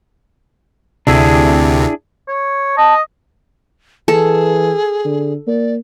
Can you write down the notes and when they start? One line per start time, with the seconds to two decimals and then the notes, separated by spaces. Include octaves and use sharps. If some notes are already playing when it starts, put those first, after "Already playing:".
1.07 D2 C3 D4 E4 G#4
2.28 C#5
2.78 D#5 A5
4.08 E3 G#4 A4
5.05 D3
5.47 A#3 D5